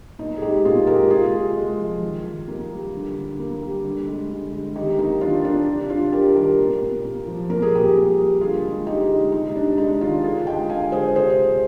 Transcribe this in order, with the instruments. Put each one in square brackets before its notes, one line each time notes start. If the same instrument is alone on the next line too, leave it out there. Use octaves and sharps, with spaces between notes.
[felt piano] A#2 D#4
G#4
G#3 D#4 G4
A#2 F4 G#4
G#3 G4 A#4
C3 F4 G#4
C3
G#3
F3
D#3
D#3
A#3
G3
D3
D3
A#3
G3
D3
G#3
D3
G#3
D#3 D#4 G4
A#3 D#4
D#3 D4 F4
A#3 D4 F4
C3
C3 D4 F4
G3 G4 A#4
D#3 G4 A#4
A#2
A#2
A#3
F3
A#2 A#4
G#4
A#2 G4 A#4
A#3
G3
D3 F4 G#4
G#3
D3 D#4 G4
G#3
C3 D#4
C3 D4
G#3 D#4
D#3 D4 F4
D3 F4 G#4
G#3 D#5 G5
D3 F5 G#5
G#3 G#4 C5
C3 G#4 C5
C3